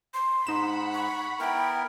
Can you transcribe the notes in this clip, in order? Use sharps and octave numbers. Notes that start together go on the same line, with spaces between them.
C6
G#2 D#4 F#5 B5 E7
C#6
B3 E4 A#4 G5